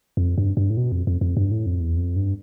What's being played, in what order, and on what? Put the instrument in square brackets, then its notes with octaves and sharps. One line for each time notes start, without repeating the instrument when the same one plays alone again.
[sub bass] F2
G2
G2
A2
B2
F2
F2
F2
G2
A2
F2
E2
F2
G2